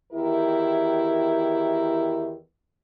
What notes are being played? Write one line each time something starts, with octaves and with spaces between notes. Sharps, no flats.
E2 D#3 E4 G4 A#4